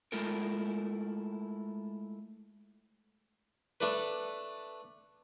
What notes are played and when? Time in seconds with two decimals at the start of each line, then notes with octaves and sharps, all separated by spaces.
0.12 G#3 A3 E4 F4 A4 A#4
3.81 A3 D4 B4